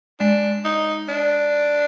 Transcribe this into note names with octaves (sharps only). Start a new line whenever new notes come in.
G#3 D4
D#4
D4